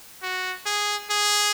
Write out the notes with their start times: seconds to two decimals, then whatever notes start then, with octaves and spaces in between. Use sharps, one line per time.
0.23 F#4
0.66 G#4
1.10 G#4